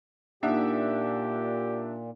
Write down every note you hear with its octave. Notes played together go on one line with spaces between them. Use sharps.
A#2 A#3 D4 D#4 G4 E5 F#5